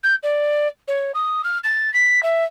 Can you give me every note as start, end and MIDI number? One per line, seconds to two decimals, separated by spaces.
0.03 0.15 91
0.23 0.68 74
0.88 1.12 73
1.15 1.42 87
1.44 1.58 89
1.64 1.92 93
1.94 2.23 95
2.23 2.44 76